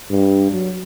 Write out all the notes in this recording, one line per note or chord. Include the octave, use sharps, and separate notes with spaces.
G2
F#3